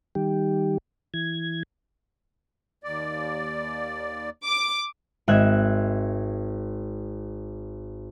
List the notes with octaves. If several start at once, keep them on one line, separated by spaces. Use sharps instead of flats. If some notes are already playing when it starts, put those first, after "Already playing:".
D#3 G3 G4
E3 G#6
D#2 D5
D6
G#1 E5 F#6 G#6